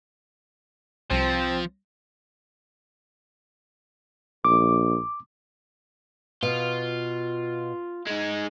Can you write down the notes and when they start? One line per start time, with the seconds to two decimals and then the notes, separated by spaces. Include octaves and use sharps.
1.10 C2 F3 C4 A#6
4.45 A#1 D6
6.43 B2 F4
8.07 G#3 D#4